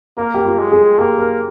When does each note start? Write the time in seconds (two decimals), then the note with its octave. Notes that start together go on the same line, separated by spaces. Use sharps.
0.17 A#3 A#4
0.34 G4
0.45 F4
0.58 G#3
0.72 G#4
0.98 A#3 G4
1.19 A#4